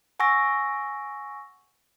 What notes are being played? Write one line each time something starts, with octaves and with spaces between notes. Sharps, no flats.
F#5 G#5 C#6 E6 A#6